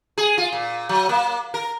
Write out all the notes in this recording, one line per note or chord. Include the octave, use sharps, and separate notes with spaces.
G#4
F4
A#2
F#3
A#3
A#4